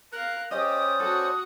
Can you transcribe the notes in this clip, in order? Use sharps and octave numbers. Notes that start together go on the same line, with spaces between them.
A#4 F5 F#6
C#4 G4 C5 D5 D#5 D#6
F#4 A4 F#5